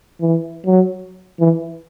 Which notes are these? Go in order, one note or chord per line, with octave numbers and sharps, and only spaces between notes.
E3
F#3
E3